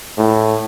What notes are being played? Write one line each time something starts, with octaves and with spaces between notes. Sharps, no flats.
A2